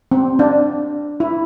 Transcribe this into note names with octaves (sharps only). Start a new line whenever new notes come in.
C4
D4
E4